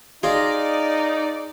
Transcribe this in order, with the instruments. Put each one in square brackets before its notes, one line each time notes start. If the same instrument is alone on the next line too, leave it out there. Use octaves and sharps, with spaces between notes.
[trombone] D#4 [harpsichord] F4 [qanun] G#4 D#5 [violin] D5